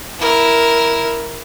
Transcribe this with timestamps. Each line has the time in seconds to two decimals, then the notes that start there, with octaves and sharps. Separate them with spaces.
0.19 E4 A#4